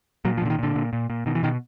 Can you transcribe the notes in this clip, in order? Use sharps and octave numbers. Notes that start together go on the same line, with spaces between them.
A#2 F#3
F3
A#2 D3
D#3
A#2 D3
A#2
A#2
A#2
B2 D#3
E3
B2 D#3